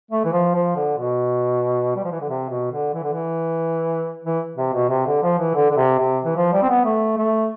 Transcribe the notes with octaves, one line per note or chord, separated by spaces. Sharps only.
A3
E3
F3
F3
D3
B2
G3
F3
E3
D3
C3
B2
D3
E3
D3
E3
E3
C3
B2
C3
D3
F3
E3
D3
D3
C3
C3
E3
F3
G3
C4
B3
A3
A3